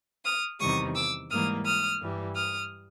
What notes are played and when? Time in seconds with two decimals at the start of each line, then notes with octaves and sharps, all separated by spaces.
0.24 D#6 F6
0.60 E2 C3 D#3 G3 C#6 D#6
0.95 D6 E6
1.30 G#2 E3 G3 A#3 D#6 F6
1.65 D#6 F6
2.00 G2 E3 G3
2.35 D#6 F6